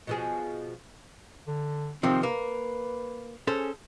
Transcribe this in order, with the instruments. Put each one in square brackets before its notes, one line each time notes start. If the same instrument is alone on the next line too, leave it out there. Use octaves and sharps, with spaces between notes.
[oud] B2 F3 G#4
[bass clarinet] D3
[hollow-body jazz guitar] C3 D#3 F3 [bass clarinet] C4
[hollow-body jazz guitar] A#3 [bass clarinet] B4
[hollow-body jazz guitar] C#4 A4 C5 [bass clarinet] G#4